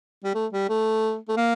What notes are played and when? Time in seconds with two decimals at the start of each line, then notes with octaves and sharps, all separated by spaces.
0.24 G3
0.35 A3
0.53 G3
0.69 A3
1.29 A3
1.37 A#3